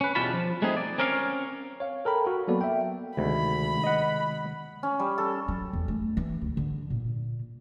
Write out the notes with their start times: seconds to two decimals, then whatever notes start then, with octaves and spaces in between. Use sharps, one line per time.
0.01 C#4 B4
0.15 E2 B2 G3 F4 A5 B5
0.34 F3
0.62 G#3 A3 B3 C4 D#4 G#4
0.77 D5
0.98 C4 C#4 A#4 C#5 D#5 F5
1.80 C#5 F5
2.05 A4 A#4 G5 B5
2.27 F#4
2.48 F#3 A#3 B3 F#4 A4 D5
2.61 E5 G5
3.17 D2 C3 D#3 G#3 B5
3.84 D#5 F#5
4.83 C#4
4.99 G3
5.18 A4
5.48 F#3
5.73 E2
5.88 A3
6.17 E3
6.42 D2
6.57 D3
6.90 A#2